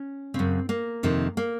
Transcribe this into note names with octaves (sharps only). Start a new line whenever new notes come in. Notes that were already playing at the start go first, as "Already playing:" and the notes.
Already playing: C#4
F#2 C#3 C4
A#3
F2 C3 D#3
A#3